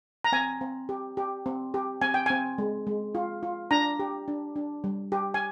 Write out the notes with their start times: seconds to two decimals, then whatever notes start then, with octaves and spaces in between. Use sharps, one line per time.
0.24 A#5
0.32 C4 G#5
0.61 C4
0.89 G4
1.17 G4
1.46 C4
1.74 G4
2.01 C4 G#5
2.14 G5
2.26 C4 G#5
2.58 G#3
2.87 G#3
3.15 F4
3.43 F4
3.71 D4 A#5
3.99 G4
4.28 D4
4.56 D4
4.84 G3
5.12 G4
5.34 G#5